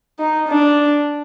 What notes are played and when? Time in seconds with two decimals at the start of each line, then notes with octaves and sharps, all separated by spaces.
0.19 D#4
0.48 D4